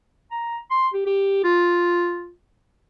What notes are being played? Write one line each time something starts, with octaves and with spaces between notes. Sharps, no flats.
A#5
C6
G4
G4
F4